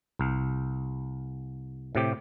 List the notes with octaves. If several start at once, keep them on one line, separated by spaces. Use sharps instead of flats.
C2
A2 C3 G4